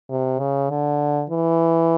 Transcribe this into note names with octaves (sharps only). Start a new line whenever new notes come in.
C3
C#3
D3
E3